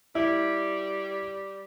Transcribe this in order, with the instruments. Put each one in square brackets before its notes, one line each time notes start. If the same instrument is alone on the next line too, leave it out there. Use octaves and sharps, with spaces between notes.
[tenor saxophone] G3 [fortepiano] E4